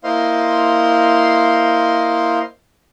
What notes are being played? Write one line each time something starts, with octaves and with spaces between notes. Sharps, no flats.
A#3 E4 C5 D#5 F5 C6